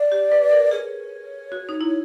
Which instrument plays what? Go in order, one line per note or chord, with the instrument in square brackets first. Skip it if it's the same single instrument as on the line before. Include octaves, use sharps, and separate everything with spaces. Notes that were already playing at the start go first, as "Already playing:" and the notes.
Already playing: [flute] D5
[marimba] G4
B4
A#4
[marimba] G#4 [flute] C#5
[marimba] F#4
D#4
E4